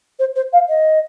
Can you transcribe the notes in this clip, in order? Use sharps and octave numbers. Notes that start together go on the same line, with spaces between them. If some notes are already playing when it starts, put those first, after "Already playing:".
C5
C5
F5
D#5